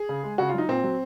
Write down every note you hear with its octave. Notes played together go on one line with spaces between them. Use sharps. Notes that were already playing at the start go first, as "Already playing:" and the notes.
Already playing: G#4
C#3
G#3
C#3 F#4
F4
F#3 D#4
A#2 C4
F#3